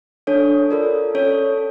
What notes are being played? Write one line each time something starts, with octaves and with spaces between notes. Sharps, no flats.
D4 A4 C#5
F4 A4 A#4 D5
C#4 A4 C#5